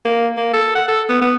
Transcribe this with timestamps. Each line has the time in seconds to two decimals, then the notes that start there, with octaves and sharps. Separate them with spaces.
0.05 A#3
0.37 A#3
0.53 A4
0.75 F#5
0.88 A4
1.09 B3
1.21 B3